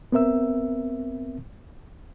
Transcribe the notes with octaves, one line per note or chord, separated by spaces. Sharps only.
B3 C4 A#4 E5 E6